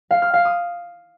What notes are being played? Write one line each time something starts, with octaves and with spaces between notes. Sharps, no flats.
F5
F6
F5
D#6